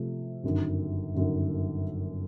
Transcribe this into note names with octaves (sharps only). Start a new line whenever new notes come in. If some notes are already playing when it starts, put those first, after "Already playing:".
Already playing: C3 F3 A3
G1 F#2 D#3
G1 F#2 D#3